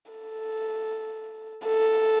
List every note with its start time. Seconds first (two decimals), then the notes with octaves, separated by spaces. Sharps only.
0.12 A4
1.66 A4